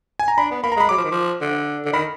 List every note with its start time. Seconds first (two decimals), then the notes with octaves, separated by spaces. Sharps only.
0.19 G#5
0.28 A#5
0.37 D4 B5
0.51 B3
0.63 A#3 B5
0.72 A#5
0.76 G#3
0.81 B5
0.89 F#3 D6
0.98 F3
1.04 D#3
1.11 F3
1.41 D3
1.85 D3
1.93 D#3 B5